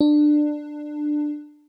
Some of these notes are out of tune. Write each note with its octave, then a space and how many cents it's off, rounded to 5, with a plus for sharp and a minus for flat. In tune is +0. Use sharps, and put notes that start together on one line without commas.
D4 +20